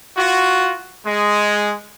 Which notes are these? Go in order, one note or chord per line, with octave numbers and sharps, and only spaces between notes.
F4 F#4
G#3